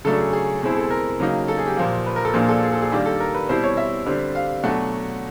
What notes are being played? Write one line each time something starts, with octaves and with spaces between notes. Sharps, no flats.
C#3 F#3 A3 D4 A4
G#4
G#4
B2 G#3 C4 E4 G#4
A4
A#4
C#3 F#3 A#3 D#4
A4
G#4
G4
A#2 F3 A#3
B4
A#4
A4
A#2 F3 A#3 D4 G#4
A4
G#4
A4
G#4
D#3 G3 A#3 D4 G4
A4
A#4
B4
B2 G3 C4 E4 C5
C#5
E5
D3 G3 C4
F5
B2 F#3 A3 D4 F#5